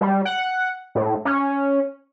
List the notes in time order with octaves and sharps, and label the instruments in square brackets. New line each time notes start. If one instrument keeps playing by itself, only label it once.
[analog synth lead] G3
F#5
A2
C#4